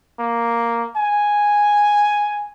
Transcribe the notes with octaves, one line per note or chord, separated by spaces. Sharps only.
A#3
G#5